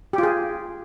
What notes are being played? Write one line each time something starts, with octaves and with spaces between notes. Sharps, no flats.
F4 G4 G#4